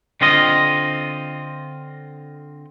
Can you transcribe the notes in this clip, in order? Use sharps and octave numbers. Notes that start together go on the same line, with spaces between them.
D3 C4 F4 D#5